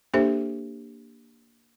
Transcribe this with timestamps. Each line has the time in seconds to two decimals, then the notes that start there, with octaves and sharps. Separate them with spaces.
0.14 A#3 D4 G4 A4 C5 E5